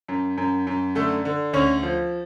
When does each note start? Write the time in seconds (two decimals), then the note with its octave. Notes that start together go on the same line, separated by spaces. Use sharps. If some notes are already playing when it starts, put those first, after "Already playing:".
0.08 F#2
0.37 F#2
0.67 F#2
0.95 D3 A3 A4
1.25 D3
1.53 D2 C#4 C#5
1.83 F3